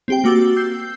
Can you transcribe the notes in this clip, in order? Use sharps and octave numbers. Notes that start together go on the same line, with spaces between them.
C4 G4 G5
A#3 F#4 D6 E6 A6 G7
E6 G6 C7